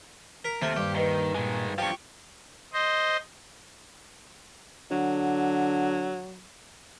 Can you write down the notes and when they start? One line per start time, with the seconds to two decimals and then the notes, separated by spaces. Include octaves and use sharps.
0.44 A#4 B6
0.62 D#2 C3 A3 C5 F6
0.77 G2 G4
0.95 D#3 B4 D#5 G7
1.35 A#2 D#3 G#3 G#5
1.78 G2 F3 G4 F5 A5 C#6
2.73 C5 D#5
4.91 D3 F#3